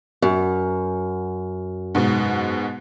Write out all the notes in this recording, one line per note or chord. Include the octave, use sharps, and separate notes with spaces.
F#2
G#2 B2